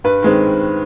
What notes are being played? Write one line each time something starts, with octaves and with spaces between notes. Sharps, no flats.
G2 B4
D#3 G#3 C4